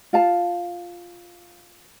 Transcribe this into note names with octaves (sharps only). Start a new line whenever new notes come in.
F4 F5 A5